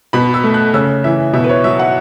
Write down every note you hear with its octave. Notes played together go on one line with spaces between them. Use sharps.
B2 B5
E6
A3
F#6
C#3 E6
E3 E5
B2 E5
B4
C#5
F#3 E5
F#5